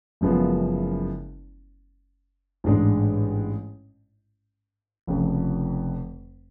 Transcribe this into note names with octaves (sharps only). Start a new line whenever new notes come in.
F#1 F#2 F3 G#3 B3
A1 G#2 G#3 D4
F1 F2 C#3